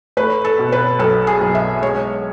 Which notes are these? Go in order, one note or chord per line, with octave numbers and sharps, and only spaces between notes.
A3 B4
A4
B2
B4
B1 A4
G#4
B1
E5
G#3 C#5